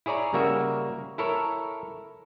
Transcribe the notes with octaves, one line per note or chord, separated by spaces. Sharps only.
E4 G#4 C#5 D5 A#5
C#3 G3 A#3 F#4 E5
E4 A4 A#4 C#5